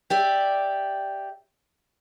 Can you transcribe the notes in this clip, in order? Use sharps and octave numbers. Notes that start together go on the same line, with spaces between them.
G4 D5 E5